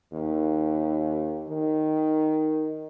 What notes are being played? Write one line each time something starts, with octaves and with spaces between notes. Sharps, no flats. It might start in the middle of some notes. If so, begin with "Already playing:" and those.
D#2
D#3